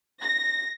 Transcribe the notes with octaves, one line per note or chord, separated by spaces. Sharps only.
A#6